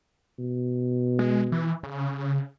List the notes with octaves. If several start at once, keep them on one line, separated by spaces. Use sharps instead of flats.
B2
G#3
E3
C#3